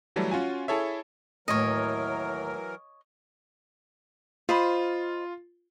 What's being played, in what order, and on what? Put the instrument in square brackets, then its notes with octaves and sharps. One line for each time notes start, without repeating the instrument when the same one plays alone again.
[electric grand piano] E3 F#3 G3 A3 A4
C#4 F4 F#4 G#5
E4 G#4 A4 C#5 E5
[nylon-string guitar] D#2 A2 [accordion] E3 F#3 A#4 [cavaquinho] C#5 D#5
[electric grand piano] F4 [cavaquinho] C5 D#5 B5